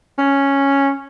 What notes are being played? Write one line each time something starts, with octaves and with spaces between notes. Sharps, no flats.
C#4